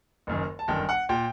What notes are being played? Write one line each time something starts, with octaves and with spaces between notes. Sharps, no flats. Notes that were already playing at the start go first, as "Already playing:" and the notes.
F#1 F#2 D#3
A5
G1 F#2 D#3 G5
F#5
A#2 G5